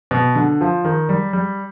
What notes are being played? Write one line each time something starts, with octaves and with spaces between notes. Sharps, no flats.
B2
D3
F3
D#3
G3
G3